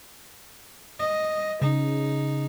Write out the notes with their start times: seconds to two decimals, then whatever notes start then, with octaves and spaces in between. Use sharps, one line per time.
0.99 D#5
1.62 C#3 D#4